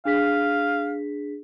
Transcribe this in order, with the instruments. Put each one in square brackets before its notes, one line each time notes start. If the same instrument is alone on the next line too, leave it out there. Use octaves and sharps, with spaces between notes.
[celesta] D4 G#4 B6 [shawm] F5